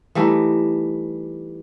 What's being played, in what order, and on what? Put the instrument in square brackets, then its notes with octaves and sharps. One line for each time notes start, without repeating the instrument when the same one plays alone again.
[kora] E3 G3 A3 D#4